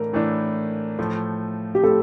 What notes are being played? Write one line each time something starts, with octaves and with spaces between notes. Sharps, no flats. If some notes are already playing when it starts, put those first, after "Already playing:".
Already playing: A2 E3 A3 D4 A#4
A2 E3 A3 D4
A2 F3 A3
G4
A2 F3 A3 A4